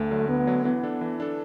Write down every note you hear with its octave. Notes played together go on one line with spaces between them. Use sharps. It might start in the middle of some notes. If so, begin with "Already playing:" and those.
Already playing: D2 A3
D3 F#3
D2 B3
D3 F#3
E3 B3
D4 A4
E3
D4 A4